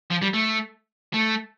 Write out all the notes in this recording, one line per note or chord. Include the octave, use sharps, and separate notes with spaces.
F3
G3
A3
A3